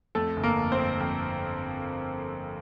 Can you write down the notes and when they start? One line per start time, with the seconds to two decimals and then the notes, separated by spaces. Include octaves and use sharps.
0.15 F2 A3 A4
0.36 G1
0.44 A#3 A#4
0.57 F2
0.72 C4 C5
0.79 F2
1.00 F2